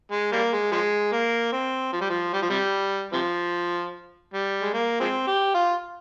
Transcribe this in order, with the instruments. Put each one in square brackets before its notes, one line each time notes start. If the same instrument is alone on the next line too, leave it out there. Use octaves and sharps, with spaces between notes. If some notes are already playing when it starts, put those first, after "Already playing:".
[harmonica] G#3
G3 A#3
G#3
F3 G#3
A#3
C4
F3
G3
F3
G3
F3
C3 G3
C3 F3
G3
G#3
A#3
F3 G#3 C4
G4
F4